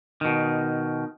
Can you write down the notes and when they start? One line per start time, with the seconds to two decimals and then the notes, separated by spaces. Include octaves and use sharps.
0.21 B2 D#3